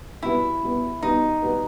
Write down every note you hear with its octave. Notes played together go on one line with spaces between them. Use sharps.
B2 G3 B3 E4
B2 G3 B3
B2 G3 B3 D#4
B2 G3 B3